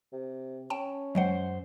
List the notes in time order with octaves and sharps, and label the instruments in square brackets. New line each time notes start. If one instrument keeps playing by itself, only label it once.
[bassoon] C3
[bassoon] C#4 [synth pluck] G5 A5
[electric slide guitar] F#2 C5 [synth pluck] F#3 G#3 F#5